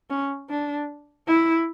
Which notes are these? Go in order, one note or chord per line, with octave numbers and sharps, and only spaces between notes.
C#4
D4
E4